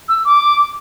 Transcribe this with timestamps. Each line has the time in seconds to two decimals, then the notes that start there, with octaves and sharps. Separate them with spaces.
0.09 E6
0.25 D6